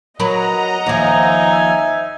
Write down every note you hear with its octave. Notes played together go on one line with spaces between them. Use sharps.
F#3 A#4 B4 D#5 F#5 A#5
D#2 F3 D#4 E5 G#5